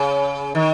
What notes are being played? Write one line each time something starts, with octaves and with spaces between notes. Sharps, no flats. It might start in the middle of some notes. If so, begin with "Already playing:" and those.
Already playing: C#3
D#3